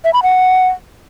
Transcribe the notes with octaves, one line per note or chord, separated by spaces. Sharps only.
E5
B5
F#5